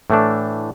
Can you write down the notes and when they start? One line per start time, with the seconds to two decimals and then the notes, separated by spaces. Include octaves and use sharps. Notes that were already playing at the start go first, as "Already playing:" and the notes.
0.10 A2 E3 A3 D4